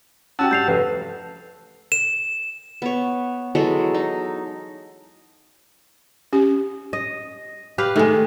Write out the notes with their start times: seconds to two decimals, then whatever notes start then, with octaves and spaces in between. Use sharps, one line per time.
0.39 C#4 F#4 G4 F#5 A5 E6
0.51 G2 G6 C7 F7
0.68 F1 A4 B4
1.92 E7
2.82 B3 C#5
3.55 E3 F#3 G#3 A4
3.94 D#4
6.33 C#4 G4
6.93 D#5
7.78 G4 B4 F5
7.96 D#3 G#3 A3 A4